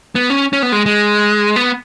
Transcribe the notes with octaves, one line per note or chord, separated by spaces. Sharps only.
B3
C#4
C#4
B3
G#3
G#3
B3